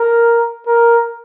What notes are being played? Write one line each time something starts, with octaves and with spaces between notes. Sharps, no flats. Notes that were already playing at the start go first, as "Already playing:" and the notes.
Already playing: A#4
A#4